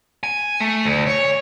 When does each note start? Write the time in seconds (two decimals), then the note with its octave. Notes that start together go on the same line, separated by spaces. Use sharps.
0.23 G#5
0.60 A3
0.85 D2
1.07 C#5